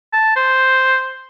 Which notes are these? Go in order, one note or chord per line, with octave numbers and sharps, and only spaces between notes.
A5
C5